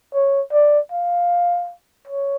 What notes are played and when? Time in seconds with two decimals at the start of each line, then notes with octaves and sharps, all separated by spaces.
0.14 C#5
0.53 D5
0.92 F5
2.08 C#5